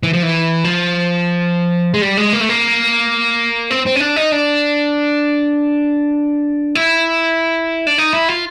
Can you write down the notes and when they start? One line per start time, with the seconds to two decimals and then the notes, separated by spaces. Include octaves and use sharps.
0.03 E3
0.13 F3
0.23 E3
0.64 F3
1.94 G#3
2.02 G3
2.17 G#3
2.33 A#3
2.41 A3
2.49 A#3
3.71 C4
3.86 C4
3.96 C#4
4.00 D4
4.16 D#4
4.32 D4
6.75 E4
7.87 D4
7.98 D#4
8.13 E4
8.28 F4